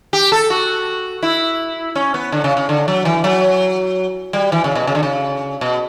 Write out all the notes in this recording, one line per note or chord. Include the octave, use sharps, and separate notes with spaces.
G4
A4
F#4
E4
C#4
B3
D3
C#3
C#3
D3
F#3
E3
F#3
G3
E3
C#3
B2
C#3
D3
C#3
B2